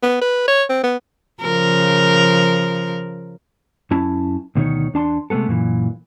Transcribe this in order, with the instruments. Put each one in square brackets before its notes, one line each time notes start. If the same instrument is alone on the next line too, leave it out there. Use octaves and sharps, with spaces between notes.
[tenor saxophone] B3
B4
C#5
C4
B3
[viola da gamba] C#3 F3 A#4
[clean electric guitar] F#2 C#4 E4 A5
D2 B2 D#3 D#4 C#5
E2 D4 A5 C6
C3 G#3 A3 B3 A4
F#2 A#2 D#3 E3